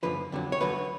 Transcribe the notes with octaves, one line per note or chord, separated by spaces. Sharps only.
F#2 D3 F3 B4
F2 D3 F#3
C#5
D2 D3 F#3 B4